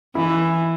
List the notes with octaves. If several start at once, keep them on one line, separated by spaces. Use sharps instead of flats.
E3 E4